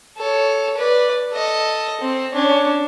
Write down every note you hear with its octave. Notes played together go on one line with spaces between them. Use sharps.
A4 C#5
B4 D5
A4 D#5
C4
C#4 D4